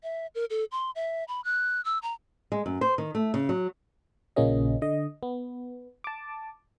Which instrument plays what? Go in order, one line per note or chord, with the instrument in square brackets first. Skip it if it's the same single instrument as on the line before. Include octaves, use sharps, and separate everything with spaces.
[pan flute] E5
A#4
A4
C6
E5
B5
F#6
E6
A#5
[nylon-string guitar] G#3
F#2
C5
D#3
A3
C#3
F#3
[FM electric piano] A#1 A#2 C#3 A#3 C#4 D#5
D3 D#5
B3
A5 D6